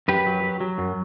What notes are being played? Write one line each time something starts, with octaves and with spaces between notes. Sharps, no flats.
F#2 G4 B4
F#3
F#3
F#3
F#2